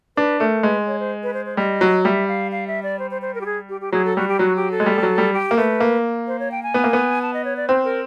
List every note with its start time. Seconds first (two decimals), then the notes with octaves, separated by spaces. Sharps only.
0.17 D4 B4
0.40 A3 A#4
0.63 G#3 B4
0.87 C#5
1.00 C5
1.23 B4
1.34 C5
1.46 C5
1.57 G3 D#5
1.81 F#3
2.05 G3 E5
2.28 F5
2.52 F5
2.67 E5
2.83 D5
2.99 C5
3.11 C5
3.22 C5
3.35 A#4
3.41 G4
3.46 G#4
3.69 G4
3.81 G4
3.92 F#3 G#4
4.05 A4
4.16 G3 F#4
4.28 G4
4.39 F#3 F#4
4.56 G4
4.71 A4
4.80 G#3
4.86 G3
4.98 G3
5.03 F#3
5.18 G3
5.33 G4
5.51 A#3
5.57 A3 B4
5.80 A#3
6.27 C5
6.39 C#5
6.51 G5
6.63 G#5
6.74 B3
6.84 A#3
6.93 B3
7.22 A5
7.34 D#5
7.45 C#5
7.57 D5
7.69 C4 C5
7.84 A#4